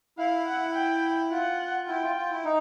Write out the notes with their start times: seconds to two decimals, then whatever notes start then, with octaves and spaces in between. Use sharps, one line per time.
0.18 E4 F5
0.47 F#5
0.75 G5
1.31 F4 F#5
1.88 E4 G5
2.02 F4
2.16 F4
2.30 E4
2.44 D#4